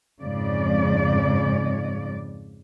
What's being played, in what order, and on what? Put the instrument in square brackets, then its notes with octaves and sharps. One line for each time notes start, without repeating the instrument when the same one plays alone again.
[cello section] F2 G#2 C#3 D5